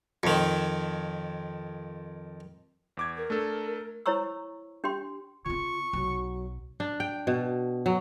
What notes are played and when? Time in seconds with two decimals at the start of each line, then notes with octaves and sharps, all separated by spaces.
0.23 F2 D#3
2.97 E2 D6 G#6
3.17 A#4
3.30 A3 D4 A4
4.06 E4 C5 C#5 A#5 C#6 E6
4.84 D4 G4 G5 C6
5.46 C#3 C4 F4 C#6
5.93 B1 F#3
6.80 D4
7.00 G5
7.27 B2
7.86 F#3